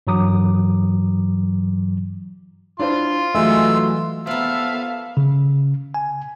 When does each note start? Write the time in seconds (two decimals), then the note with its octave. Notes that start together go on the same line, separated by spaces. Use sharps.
0.07 G2 E3 F#3 A#5 D6 D#6
2.79 D4 E4 F4 C5 C6
3.35 E3 F#3 G#3 A3 E6
4.27 F3 A#3 B3 A4 E5 F5
5.17 C#3
5.94 G#5